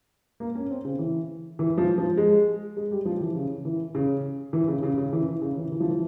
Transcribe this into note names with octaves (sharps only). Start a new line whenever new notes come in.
A#3
C#4
C4
C#3
E3
E3
F3
F3
G#3
G#3
G3
F3
E3
C#3
E3
C#3
E3
C#3
C#3
C#3
E3
E3
C#3
E3
E3
F3
E3